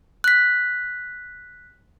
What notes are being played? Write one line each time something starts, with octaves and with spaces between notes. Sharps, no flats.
F#6 B6